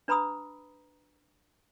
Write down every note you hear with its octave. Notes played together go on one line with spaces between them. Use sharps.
D4 B4 A#5 B5 D#6 E6